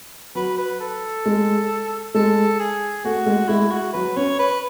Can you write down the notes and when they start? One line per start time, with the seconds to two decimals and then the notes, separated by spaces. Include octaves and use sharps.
0.35 F#3 B4
0.58 B4
0.80 A4
1.26 G#3
2.15 G#3 A4
2.60 G#4
3.04 A3 F#4
3.26 G#3
3.49 G#3 E4
3.71 F#4
3.93 F#3 B4
4.16 C#4 C#5
4.39 B4